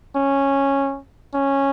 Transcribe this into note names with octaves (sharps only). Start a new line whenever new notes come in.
C#4
C#4